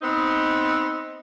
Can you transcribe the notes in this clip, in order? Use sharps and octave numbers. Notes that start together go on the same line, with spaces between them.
B3 C4 D#4